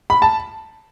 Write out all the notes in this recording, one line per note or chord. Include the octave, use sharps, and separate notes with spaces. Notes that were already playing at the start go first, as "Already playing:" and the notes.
B5
A5